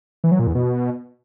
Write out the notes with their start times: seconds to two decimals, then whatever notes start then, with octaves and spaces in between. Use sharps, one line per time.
0.24 E3
0.32 F#3
0.39 A#2
0.47 E2
0.55 B2